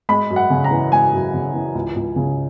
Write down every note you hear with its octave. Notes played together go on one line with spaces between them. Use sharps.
G#3 B5
F#2
F#5
C#3
A#5
E3
G#3 G#5
F#2
C#3
E3
C#2
C#2
C#3